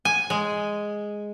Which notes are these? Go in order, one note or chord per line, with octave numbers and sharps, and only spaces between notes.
G#5
G#3